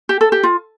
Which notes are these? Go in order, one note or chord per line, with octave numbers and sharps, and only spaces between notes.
G4
A4
G4
F4